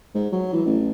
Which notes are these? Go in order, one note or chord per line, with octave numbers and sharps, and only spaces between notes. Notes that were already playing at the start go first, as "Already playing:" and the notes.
G#2
F#3
E3
A1